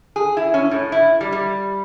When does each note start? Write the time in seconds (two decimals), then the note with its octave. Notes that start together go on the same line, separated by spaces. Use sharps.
0.16 G#4
0.37 E4
0.54 C#4
0.71 A2
0.92 E4
1.21 G3
1.32 G3